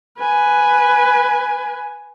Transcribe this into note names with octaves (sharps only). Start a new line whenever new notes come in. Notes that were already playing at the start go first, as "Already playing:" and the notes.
B4 G#5